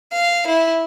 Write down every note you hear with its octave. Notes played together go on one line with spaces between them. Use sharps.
F5
E4